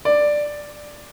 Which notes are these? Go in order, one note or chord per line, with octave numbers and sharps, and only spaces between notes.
D5